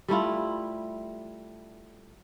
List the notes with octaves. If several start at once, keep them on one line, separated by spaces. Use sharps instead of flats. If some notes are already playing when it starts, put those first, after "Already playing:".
G3 A3 E4 F4